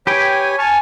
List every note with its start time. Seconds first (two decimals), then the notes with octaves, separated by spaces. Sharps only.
0.07 G4 B4 C#5 G5 G#5
0.59 G#5 A5 C#6 F6